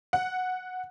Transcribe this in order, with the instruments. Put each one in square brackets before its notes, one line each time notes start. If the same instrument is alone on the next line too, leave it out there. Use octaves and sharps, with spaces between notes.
[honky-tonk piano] F#5